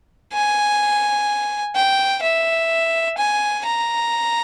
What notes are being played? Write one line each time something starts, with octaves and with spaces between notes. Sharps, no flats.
G#5
G5
E5
G#5
A#5